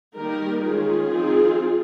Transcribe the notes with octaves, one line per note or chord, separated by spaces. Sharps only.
D#3 G3 A#3 D#4 G4 A#4
D#3 G#3 C#4 F4 G#4
F3 C4 D#4